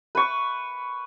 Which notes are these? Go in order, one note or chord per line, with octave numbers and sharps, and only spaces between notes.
B4 C#6